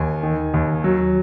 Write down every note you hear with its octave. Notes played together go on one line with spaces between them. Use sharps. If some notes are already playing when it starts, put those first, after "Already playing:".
Already playing: D#2 G#5
D#3
D#2
F#3